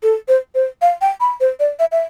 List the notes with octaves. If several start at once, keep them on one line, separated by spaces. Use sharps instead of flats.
A4
C5
C5
F5
G5
B5
C5
D5
E5
E5